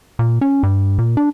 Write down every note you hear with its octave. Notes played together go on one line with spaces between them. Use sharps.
A#2
C#4
G2
A#2
D4